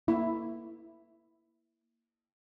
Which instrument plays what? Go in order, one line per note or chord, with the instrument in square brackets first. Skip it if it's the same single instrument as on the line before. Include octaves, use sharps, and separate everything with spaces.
[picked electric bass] A#3 [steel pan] E4